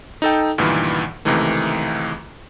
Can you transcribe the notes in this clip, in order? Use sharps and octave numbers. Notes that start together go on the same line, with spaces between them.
D#4 A4 G5
D2 G2 A#2 D#3 E3
C#2 C3 D#3 E3 A3